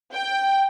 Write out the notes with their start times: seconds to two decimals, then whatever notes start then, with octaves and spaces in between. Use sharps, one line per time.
0.14 G5